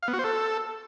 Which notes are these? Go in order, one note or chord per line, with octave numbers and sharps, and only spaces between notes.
F5
B3
F#4
C5
A4